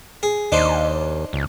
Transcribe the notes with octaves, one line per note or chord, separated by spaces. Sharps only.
G#4
D#2 D4 D#4 C5
C#2